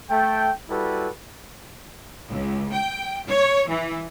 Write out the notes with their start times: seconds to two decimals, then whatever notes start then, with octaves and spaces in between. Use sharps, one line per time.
0.10 A3 G5
0.70 G3 E4 F#4 A4 B4
2.29 C#2
2.73 G5
3.28 C#5
3.68 E3